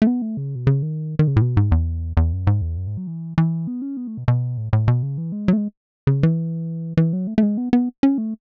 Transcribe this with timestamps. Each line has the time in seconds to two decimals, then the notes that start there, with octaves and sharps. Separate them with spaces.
0.02 A3
0.07 B3
0.22 A3
0.37 C#3
0.55 B2
0.67 C#3
0.82 D#3
1.19 D#3
1.27 C#3
1.36 A2
1.42 B2
1.57 G#2
1.72 E2
2.17 E2
2.33 F#2
2.47 G#2
2.62 E2
2.77 F#2
2.87 G#2
2.97 F#3
3.07 E3
3.38 E3
3.67 B3
3.82 C#4
3.97 B3
4.07 A3
4.17 B2
4.28 B2
4.58 A2
4.73 A2
4.88 B2
5.03 C#3
5.18 E3
5.32 G#3
5.48 F#3
5.53 A3
5.57 G#3
6.07 C#3
6.23 E3
6.97 E3
7.13 F#3
7.27 A3
7.38 A3
7.43 G#3
7.57 B3
7.73 B3
8.03 C#4
8.18 A3